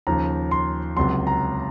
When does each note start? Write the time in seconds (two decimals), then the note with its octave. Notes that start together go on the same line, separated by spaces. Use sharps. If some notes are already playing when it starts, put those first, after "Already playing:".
0.07 D#2 C#3 F3 A#5
0.51 C6
0.97 C#2 C3 F#3 C6
1.27 A#5